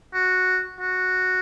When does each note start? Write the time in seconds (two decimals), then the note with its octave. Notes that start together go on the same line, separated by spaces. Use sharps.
0.14 F#4
0.80 F#4